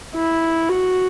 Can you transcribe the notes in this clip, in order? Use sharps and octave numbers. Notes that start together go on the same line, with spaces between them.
E4
F#4